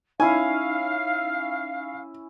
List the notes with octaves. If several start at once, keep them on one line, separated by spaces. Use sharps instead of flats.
C#4 D#4 E4 F5 G#5